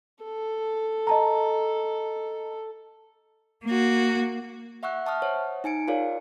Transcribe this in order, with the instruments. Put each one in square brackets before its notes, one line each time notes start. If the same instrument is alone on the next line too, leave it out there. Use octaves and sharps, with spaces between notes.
[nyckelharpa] A4
[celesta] D#5 A5 A#5
[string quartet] A#3 F#4
[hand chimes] E5 F#5 C#6 E6 F#6
E5 A5 C#6 D#6 F6
C5 C#5 F#5
D#4 G#5 C#7 D7
F4 G#4 A#4 C#5 D5 F5